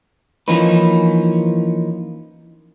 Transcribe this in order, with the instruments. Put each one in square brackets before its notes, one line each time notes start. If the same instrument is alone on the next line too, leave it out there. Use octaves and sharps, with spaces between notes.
[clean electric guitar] E3 F3 A#3 C#4 D#4 B4